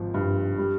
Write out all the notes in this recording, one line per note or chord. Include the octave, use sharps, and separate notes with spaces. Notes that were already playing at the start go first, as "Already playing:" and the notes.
Already playing: G#1 F3
G2
G3